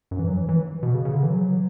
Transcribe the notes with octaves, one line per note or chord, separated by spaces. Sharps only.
F#2
E3
F#3
E3
E3
B2
C#3
C#3
D3
E3
F#3